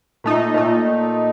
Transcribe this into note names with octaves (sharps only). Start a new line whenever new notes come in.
A#2 A3 D#4
A#2 A3 D#4